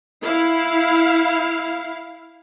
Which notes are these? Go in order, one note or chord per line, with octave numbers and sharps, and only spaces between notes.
E4 F5